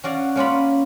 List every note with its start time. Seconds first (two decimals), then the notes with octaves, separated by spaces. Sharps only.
0.04 C#4 F#4 D5 F5
0.36 A#3 C#4 F4 B5